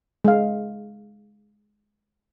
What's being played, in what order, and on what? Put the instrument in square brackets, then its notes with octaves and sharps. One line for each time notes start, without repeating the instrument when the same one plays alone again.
[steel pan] G#3 F5